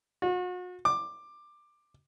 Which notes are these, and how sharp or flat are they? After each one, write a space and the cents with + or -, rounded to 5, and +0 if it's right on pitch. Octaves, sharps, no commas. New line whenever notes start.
F#4 -40
D6 +15